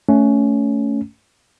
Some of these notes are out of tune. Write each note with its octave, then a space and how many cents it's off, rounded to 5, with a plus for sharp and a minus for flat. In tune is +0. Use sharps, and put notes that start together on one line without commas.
A3 +0 C#4 +15